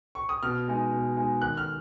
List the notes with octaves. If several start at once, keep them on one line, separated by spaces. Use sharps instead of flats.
C#6
D#6
B2 F6
G#3 D#4
B2
G#3 D#4
D#3 F#6
F6